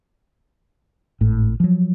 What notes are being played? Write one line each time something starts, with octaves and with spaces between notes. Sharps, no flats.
G#1 A2
F3 F#3